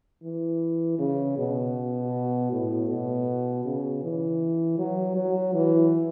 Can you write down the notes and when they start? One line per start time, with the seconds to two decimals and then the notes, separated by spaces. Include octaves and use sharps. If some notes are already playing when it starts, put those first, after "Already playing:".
0.24 E3
0.99 C#3
1.38 B2
2.52 A2
2.89 B2
3.65 C#3
4.03 E3
4.78 F#3
5.16 F#3
5.54 E3